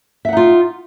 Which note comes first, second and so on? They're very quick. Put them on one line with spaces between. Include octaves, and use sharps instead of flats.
E5 F#5 D#4 F4